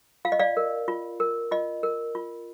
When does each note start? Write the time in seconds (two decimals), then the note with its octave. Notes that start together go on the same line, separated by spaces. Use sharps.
0.25 F4 F5
0.32 D#5
0.39 D5 F5
0.57 A#4
0.88 F4
1.20 A#4
1.52 F4 D#5
1.83 A#4
2.15 F4